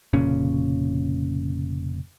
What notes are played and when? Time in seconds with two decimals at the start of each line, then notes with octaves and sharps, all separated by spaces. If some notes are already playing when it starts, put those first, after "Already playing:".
0.13 F1 A#2 C#3 C#4